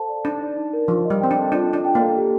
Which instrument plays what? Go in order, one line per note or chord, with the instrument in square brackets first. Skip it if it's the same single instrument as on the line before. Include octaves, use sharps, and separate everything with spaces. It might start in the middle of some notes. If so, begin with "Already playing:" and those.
Already playing: [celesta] A4 C5 F5 A5
D5
[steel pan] D4 [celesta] D#4
[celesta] D5
D#4
A#4
[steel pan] F3 [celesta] D4
[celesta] D#5
[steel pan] G3
[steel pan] C4 [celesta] G5
[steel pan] D4
[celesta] A4
[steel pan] D4 [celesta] F4
[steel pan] D4 [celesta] D#5
[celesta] G5
[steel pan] A#3
[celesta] A4
G4